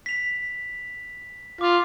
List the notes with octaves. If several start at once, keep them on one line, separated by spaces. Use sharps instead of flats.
B6 F7
F4 D6